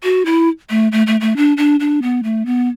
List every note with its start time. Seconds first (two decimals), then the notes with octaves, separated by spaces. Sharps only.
0.03 F#4
0.26 E4
0.70 A3
0.92 A3
1.07 A3
1.21 A3
1.37 D4
1.57 D4
1.80 D4
2.02 B3
2.23 A3
2.46 B3